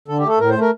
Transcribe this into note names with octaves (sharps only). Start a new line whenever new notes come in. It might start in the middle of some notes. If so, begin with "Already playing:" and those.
D3 A4
G4
A3
A4
A2 A#4
C5
A3
A#4